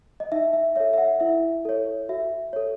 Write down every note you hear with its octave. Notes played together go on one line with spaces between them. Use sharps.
D#5
D#4 E5
E5
A4 C#5 E5
E5
F#5
E4 E5
A4 C#5
F#4 E5
A4 C#5